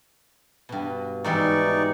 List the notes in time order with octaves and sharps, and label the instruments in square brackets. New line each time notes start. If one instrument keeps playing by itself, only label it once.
[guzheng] G2 B2
[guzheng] G#2 E3 G3 [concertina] D#4 D5 C#6